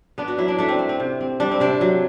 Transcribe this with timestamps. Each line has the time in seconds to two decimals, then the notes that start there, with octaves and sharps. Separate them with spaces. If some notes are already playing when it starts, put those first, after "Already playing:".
0.18 B3 D4
0.28 F#4
0.38 F#3 E4
0.48 D4
0.58 A3 D4
0.68 C4
0.79 A3
0.89 C4
1.00 C3
1.21 C4
1.40 G3 D4
1.51 C4
1.60 C3 D4
1.81 F#3